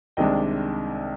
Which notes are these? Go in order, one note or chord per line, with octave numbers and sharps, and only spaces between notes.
C2 C3 D#3 G#3 D4 D#5 G5